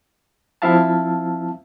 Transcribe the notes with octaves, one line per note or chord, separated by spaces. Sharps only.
F3 C4 E4 E5 F5 A5